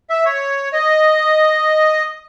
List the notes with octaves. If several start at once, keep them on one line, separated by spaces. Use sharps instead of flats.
E5
C#5
D#5